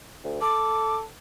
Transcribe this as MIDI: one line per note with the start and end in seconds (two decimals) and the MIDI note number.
0.24 0.37 38
0.41 1.04 69
0.41 0.96 86